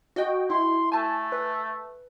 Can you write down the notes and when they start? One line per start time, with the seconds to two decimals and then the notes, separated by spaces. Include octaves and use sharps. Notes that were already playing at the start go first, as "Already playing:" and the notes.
0.16 F#4 D#5 G5
0.50 E4 C6
0.92 A3 G#5 A5
1.32 B4